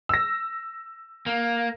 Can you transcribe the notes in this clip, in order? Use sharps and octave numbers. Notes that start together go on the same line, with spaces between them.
E6 A#6
A#3